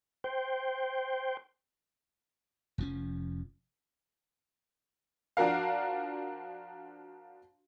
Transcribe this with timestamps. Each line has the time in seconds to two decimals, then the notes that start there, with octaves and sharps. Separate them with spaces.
0.24 C5 G5
2.78 F1 F3 C#4
5.37 F3 D4 F#4 A#4 F5